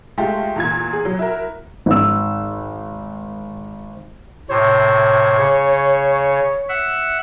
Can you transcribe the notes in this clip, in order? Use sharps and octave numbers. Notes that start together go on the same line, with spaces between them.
G#3 A3 F4 G4
E2 A#2 G#6
G#4
F#3
E4 F#4 A#4
G#1 E6
A2 C3 C5 C#5
C#3
E5 F#5